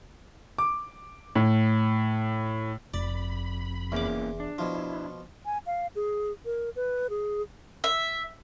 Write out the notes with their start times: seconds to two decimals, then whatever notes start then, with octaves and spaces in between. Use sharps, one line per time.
0.58 D6
1.36 A2
2.94 F1 F2 D5 B5
3.92 E2 E3 A#3 C#4 D6
4.40 D4
4.58 B2 F3 E4
5.44 G#5
5.66 F5
5.95 G#4
6.45 A#4
6.76 B4
7.10 G#4
7.84 E5